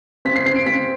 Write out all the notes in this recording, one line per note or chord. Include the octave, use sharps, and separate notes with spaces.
C4 B6
C7
C4 C7
D7
C4 B6